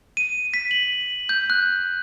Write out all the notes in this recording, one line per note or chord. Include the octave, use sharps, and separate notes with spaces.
D#7
B6
F#7
G6
F#6